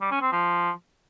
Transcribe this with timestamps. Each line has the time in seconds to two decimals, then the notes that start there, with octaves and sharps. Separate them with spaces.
0.01 G3
0.12 C#4
0.22 C4
0.32 F3